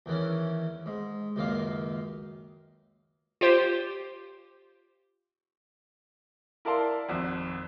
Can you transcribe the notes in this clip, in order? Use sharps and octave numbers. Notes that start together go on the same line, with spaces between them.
E2 D#3 E3 C#4
G#2
C#2 F#2 D#3 A#3 F5
F4 G4 C5
E4 A#4 D5 F5 A5 C6
G#1 F2